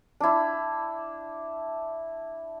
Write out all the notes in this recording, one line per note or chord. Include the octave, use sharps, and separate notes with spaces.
D4 E4